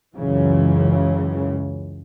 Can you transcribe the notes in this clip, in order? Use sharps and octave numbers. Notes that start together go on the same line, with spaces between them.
C#2 F#2 C#3 E3